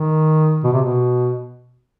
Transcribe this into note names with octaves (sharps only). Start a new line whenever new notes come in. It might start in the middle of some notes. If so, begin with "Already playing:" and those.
Already playing: D#3
B2
C3
B2